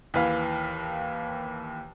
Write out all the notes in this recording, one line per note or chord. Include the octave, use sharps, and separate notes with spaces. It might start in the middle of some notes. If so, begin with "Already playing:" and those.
D#2 E3 B4 F5